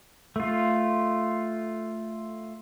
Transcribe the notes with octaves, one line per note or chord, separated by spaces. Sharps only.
A3 F4